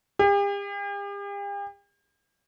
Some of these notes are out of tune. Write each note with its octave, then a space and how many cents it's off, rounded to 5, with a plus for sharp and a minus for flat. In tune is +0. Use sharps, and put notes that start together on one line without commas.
G4 +45